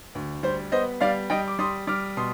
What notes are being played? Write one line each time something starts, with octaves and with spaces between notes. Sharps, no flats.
D2
G3 C5
B3 C5 D#5
G3 D5 F5
G3 D#5 G5
D6
G3 C6 D#6
G3 D6 F6
B2 C6 D#6